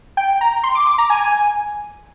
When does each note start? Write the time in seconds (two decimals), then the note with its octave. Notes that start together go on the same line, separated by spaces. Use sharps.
0.17 G5
0.41 A#5
0.63 C6
0.75 D6
0.87 D6
0.98 A#5
1.10 G#5